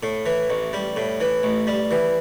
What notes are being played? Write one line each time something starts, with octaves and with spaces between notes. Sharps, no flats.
A2
E3
A1
G3
A2
E3
A1
G3
E3